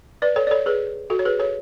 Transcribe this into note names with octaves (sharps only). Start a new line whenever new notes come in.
B4 D5
A4 C#5
D5
A4 C#5
G#4 B4
F#4 A4
C#5
G#4 B4
A4 C#5